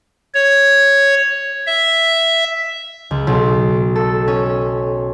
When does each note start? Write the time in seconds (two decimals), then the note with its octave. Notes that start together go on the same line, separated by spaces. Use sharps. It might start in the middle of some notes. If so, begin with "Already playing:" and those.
0.34 C#5
1.67 E5
3.11 C#2
3.27 B1
3.95 A4
4.28 C#4